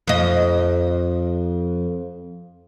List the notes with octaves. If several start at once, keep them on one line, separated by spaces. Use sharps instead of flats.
F2 D#5